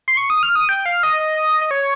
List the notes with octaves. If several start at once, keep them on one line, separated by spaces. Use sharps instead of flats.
C6
C#6
D#6
F6
D#6
G5
F5
D#5
D#5
D#5
C#5